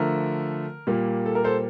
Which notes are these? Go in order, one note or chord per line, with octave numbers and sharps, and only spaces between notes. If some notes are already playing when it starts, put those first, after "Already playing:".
Already playing: D3 F3 A3 A#4
A#2 G3 A#3
A4
A#4
A4 C5